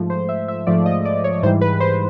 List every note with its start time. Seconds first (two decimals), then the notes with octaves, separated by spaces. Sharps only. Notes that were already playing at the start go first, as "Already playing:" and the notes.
Already playing: G#2 F3 A3
0.10 C5
0.29 E5
0.48 E5
0.67 G#2 F3 A3 D5
0.86 D#5
1.05 D5
1.24 C#5
1.43 G#2 E3 G3 C5
1.61 B4
1.80 C5